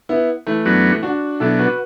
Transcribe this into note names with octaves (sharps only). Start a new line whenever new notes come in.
B3 E4
E3 A3
F#2 F#3 B3 D4 F#4
D4 F#4
B2 F#3 D4 E4 A4
F#4 B4